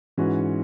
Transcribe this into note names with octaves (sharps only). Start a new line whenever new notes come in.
G#2 E3 C#4 F#4